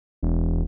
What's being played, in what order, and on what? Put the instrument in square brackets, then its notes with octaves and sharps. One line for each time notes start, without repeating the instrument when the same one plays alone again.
[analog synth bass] E1